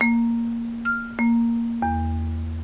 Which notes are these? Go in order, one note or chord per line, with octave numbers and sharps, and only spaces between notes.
A#3
F6
A#3
E2